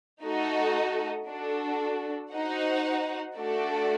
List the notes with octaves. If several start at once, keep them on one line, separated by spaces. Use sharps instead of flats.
A3 D#4 F#4 A4 D#5
D4 F#4 A4
D#4 F#4 C5 F#5
A3 D4 F#4 A4 D5